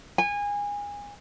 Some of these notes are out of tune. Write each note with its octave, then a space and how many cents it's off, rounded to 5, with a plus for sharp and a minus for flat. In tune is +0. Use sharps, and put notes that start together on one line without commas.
G#5 -25